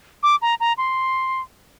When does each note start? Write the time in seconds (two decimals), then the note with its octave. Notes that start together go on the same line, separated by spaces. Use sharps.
0.23 D6
0.42 A#5
0.60 A#5
0.78 C6